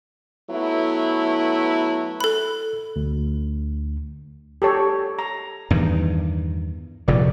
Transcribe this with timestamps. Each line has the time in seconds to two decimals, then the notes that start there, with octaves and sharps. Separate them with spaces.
0.51 F#3 A3 B3 E4
2.21 A4 B5 F#6
2.96 D2
4.62 G4 A4 C#5
5.19 A#5
5.71 E2 G2 D#3
7.08 F1 A#2 C#3 D5